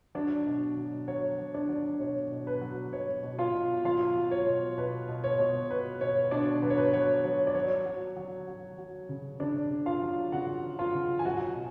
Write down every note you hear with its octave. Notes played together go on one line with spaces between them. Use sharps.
F#3 D4 D5
B2
F#3
F#3 C#5
F#3
D4 D5
F#3
B2 C#5
B2
B4
F#3
B2 C#5
B2
F4 F5
B2
F#3 F4 F5
F#3
C#5
B2
B2 B4
B2
C#5
B2
B2 B4
B2 C#5
B2 D4 D5
F#3 B4
C#5
B4
F#3 C#5
F#3 C#5
D5
F#3 C#5
F#3
F#3
F#3
F#3
C#3
C#3 D4 D5
C#3
F4 F5
F#3
C#3 F#4 F#5
F#3
F4 F5
C#3
G#5
F#3 F#4 F#5
B2